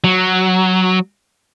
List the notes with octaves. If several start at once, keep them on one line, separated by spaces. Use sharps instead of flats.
F#3